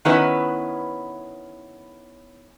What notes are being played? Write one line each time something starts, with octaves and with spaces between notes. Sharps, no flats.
D#3 B3 C#4 E4 B4